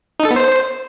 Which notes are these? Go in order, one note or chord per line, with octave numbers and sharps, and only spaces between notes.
D#4
A4
B3
C5